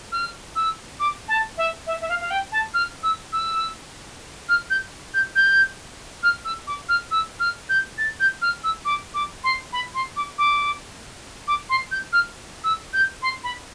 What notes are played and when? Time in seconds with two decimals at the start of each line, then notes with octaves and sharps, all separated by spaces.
0.12 F6
0.56 E6
1.00 D6
1.28 A5
1.58 E5
1.87 E5
2.01 E5
2.09 F5
2.20 F5
2.31 G5
2.52 A5
2.74 F6
3.03 E6
3.33 E6
4.49 F6
4.70 G6
5.14 G6
5.36 G6
6.23 F6
6.45 E6
6.67 D6
6.89 F6
7.11 E6
7.40 F6
7.69 G6
7.98 A6
8.20 G6
8.42 F6
8.64 E6
8.85 D6
9.14 D6
9.44 C6
9.73 B5
9.94 C6
10.16 D6
10.38 D6
11.48 D6
11.69 C6
11.91 G6
12.13 F6
12.64 E6
12.93 G6
13.22 C6
13.44 B5